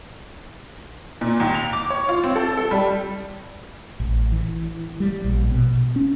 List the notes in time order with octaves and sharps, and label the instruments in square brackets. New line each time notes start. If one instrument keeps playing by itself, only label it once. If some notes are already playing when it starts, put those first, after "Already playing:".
[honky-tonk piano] A#2
D#2
F7
D6
C#5
F4
C4
A4
A4
G3
[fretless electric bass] A1
E3
G3
A#1
B2
C#4